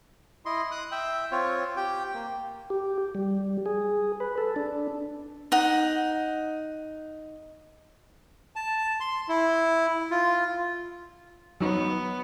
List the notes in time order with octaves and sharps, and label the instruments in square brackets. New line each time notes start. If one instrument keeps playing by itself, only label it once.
[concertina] E4 D#5 C6
D#6 F#6
E5 G5
C4 F4 C#5
G4 G5
A#3
[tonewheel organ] G4
G3
G#4
B4
A4
D4
[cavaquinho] D#4 F#5
[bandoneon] A5
C6
E4
F4
[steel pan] F#3 D#4 [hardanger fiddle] B3